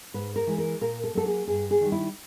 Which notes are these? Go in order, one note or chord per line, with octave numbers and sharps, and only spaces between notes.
G#2 B4
A#4
E3 G#3
A#4
A#2 A#4
A4
F#3 A#3 A4
G#4
G2 G#4
G#4
D#3 G3
E4